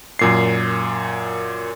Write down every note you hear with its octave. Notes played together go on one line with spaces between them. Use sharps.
F#2 A#2 C7